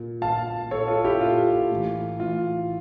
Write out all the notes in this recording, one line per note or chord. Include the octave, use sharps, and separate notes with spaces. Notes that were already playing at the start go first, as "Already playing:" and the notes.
Already playing: A#2
A#2 F5 A5
A#2 A4 C#5
F4 A4
E4 G4
A#2 F4
A2 E3
A2 E3 F4